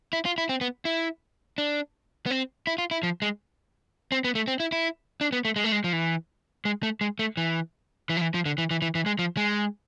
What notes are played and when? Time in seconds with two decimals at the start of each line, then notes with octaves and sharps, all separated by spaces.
0.13 E4
0.25 F4
0.38 E4
0.49 C4
0.61 B3
0.85 E4
1.58 D4
2.26 B3
2.31 C4
2.67 E4
2.78 F4
2.91 E4
3.03 F3
3.22 G#3
4.12 C4
4.24 B3
4.35 A3
4.48 C4
4.60 E4
4.72 E4
5.21 D4
5.32 B3
5.45 A3
5.56 G#3
5.64 A3
5.72 G#3
5.84 F3
5.93 E3
6.65 G#3
6.83 A3
7.01 G#3
7.19 A3
7.37 E3
8.09 E3
8.17 F3
8.21 E3
8.34 F3
8.46 D3
8.58 E3
8.71 E3
8.82 E3
8.95 E3
9.06 G#3
9.19 F3
9.37 G#3